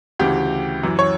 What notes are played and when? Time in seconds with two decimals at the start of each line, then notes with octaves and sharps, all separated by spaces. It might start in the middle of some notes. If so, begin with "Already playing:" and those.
0.19 D2 C#3 E3 G4
0.83 F#2 E3
0.99 C#5